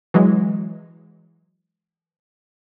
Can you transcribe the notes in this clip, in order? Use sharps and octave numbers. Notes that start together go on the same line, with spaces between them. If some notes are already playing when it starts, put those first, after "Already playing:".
E3 F#3 G#3